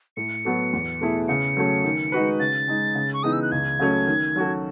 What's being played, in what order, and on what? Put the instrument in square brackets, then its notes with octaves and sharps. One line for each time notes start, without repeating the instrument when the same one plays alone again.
[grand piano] A2 [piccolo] C#7
[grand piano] F#3 B3 F#4 A4
E2
B2 A3 E4 G#4
[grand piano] C#3 [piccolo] C#7
[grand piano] F#3 A3 C#4
D#3
G#3 D#4 F#4 B4
[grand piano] C#3 [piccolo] A6
[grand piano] G#3 D#4
C#3
[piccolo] C#6
[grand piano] E3 B3 D#4 G#4 [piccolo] D#6
[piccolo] E6
F#6
[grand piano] C#2 [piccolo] G#6
[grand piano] C#3 F#3 A3 C#4
D#3
F#3 C#4 F#4 A4